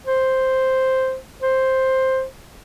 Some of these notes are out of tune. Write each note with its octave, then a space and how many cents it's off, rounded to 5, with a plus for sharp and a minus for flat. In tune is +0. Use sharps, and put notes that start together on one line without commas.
C5 +0
C5 +5